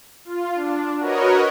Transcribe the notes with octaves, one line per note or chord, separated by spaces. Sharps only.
F4
D4
F#4 A#4 B4 C#5 D#5